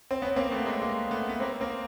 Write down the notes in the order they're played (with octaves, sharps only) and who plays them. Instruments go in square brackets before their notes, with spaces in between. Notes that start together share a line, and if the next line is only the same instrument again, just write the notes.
[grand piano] C4
B3 C#4
A#3 C4
A3 B3
G#3 A#3
G#3 A#3
A3 B3
B3
A#3 C4
A#3 C4